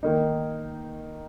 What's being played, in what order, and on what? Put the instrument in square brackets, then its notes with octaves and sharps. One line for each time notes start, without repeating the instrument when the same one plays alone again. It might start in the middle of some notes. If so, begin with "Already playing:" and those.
[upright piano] D#3 A#3 D#4